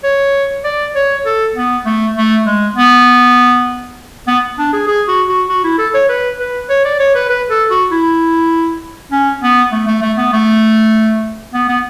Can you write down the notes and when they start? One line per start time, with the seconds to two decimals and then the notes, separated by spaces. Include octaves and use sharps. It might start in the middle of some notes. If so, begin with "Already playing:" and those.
0.04 C#5
0.64 D5
0.95 C#5
1.26 A4
1.56 B3
1.86 A3
2.16 A3
2.46 G#3
2.76 B3
4.28 B3
4.59 D4
4.73 G#4
4.88 G#4
5.08 F#4
5.29 F#4
5.49 F#4
5.64 E4
5.78 A4
5.94 C#5
6.09 B4
6.40 B4
6.69 C#5
6.85 D5
7.00 C#5
7.15 B4
7.30 B4
7.50 A4
7.70 F#4
7.91 E4
9.11 C#4
9.42 B3
9.72 A3
9.87 A3
10.02 A3
10.18 B3
10.33 A3
11.54 B3
11.69 B3